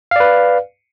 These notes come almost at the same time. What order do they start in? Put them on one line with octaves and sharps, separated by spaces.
F5 D5 B4